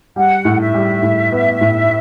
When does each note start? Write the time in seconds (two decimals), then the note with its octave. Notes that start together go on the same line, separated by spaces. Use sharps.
0.16 G3 F#5
0.45 A2
0.60 E5
0.74 G3
1.03 A2
1.32 B3
1.61 A2